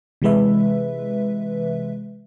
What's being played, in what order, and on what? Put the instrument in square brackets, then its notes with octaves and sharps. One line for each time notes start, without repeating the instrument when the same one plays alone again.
[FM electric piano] C3 E3 G#3 B4 E5